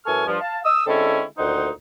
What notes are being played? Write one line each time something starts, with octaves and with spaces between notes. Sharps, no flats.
F#2 E3 A4 G#5 C#6 F6
G2 F3
F5 A5
D#6 E6
D3 G#3 C4 C#4 E4 A4
D2 A#2 D#3 D#4 C5 F#5